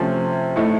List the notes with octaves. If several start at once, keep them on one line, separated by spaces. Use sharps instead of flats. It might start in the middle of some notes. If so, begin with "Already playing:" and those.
Already playing: C3 F3 A3 C#4
A2 A3 D#4